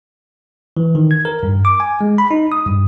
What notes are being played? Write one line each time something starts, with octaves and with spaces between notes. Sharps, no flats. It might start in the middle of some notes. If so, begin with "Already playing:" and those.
E3
D#3
G#6
A#4
G2
D6
G#5
G#3
B5
D#4
D#6
G2